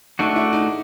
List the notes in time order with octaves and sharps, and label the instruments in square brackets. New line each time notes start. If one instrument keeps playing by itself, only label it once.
[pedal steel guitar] A3 D4 F#4 [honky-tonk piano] D#4
[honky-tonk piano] E4
D#4